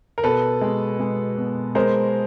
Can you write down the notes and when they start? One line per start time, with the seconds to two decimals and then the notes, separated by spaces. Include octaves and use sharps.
0.18 A#4
0.24 B2 A4 B4
0.61 G#3
1.00 G#3
1.38 B2
1.75 G#3 A#4 C5